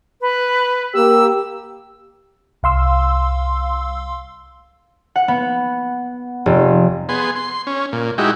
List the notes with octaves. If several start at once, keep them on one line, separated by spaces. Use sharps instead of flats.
B4
A#3 G4 E6
C2 F5 C6 E6
F#5
B3
F1
B3 G#4 C6
C6
C#4
A#2
G#3 D#4 E4 F#4 G4